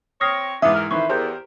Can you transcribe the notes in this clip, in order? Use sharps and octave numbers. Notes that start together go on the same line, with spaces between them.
C4 C#5 D#6 F6 A#6 C7
G#2 E3 B3 D4 F4 E5 D6 D#6
A#4
F2 D#3 E3 B4 C5 C#6
E2 G4 A#4 C5 A#5 G6